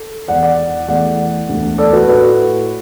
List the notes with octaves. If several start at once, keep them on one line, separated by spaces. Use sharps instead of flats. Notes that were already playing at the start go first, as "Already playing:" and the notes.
Already playing: A4
E1 E2 E3 D5 F#5
D5 F#5
E2 E3 A3 D5 F#5
E1 D2 D3 A3
A4 D5
F#4 B4
A4
A2 A3 F#4 B4